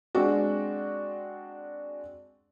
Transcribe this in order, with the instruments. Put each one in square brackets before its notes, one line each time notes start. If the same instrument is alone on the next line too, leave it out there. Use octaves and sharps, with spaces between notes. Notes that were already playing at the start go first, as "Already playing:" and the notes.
[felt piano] G#3 C4 D4 F#4